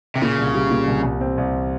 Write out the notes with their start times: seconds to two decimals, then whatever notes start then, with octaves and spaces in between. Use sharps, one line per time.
0.16 C3
0.21 A#2 C#3
0.38 C2
0.55 G3
0.70 A#2
0.87 C2
1.04 C2
1.21 C4
1.38 C2